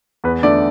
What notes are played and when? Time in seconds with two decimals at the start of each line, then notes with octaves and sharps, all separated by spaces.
0.24 E2 B4
0.43 D3 A3 D5